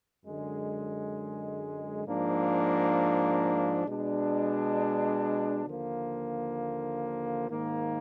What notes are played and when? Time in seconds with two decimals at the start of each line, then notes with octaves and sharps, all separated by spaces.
0.24 F#2 D3 G#3
2.04 G#2 F3 A#3 D4
3.85 B2 G#3 D4
5.66 D#2 D3 F3 A#3
7.47 G#2 D#3 A#3